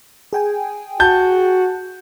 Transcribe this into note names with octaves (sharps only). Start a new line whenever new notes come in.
G#4 G5 G#5
F#4 A5 G6